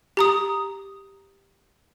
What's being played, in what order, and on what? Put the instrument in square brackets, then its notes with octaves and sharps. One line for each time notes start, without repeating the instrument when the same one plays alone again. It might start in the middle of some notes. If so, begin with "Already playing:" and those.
[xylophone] G4 A#5 D#6